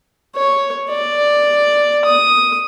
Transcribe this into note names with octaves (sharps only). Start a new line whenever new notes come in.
C#5
D5
D#6